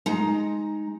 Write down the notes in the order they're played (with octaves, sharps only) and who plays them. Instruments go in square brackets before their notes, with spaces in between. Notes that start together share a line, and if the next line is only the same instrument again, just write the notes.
[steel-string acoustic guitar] G#3 D#4 A#5